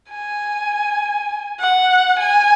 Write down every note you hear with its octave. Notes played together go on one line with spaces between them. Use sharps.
G#5
F#5
G#5